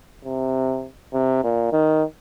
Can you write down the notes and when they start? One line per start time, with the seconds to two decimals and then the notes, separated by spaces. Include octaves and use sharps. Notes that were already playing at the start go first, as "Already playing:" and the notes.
0.25 C3
1.13 C3
1.43 A#2
1.72 D#3